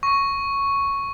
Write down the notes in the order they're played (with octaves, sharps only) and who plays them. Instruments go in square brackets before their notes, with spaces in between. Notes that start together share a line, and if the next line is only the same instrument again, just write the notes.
[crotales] C#6